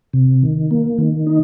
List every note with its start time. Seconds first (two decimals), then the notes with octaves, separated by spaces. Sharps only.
0.13 C3
0.43 D#3
0.71 A#3
0.98 D#3
1.27 D#4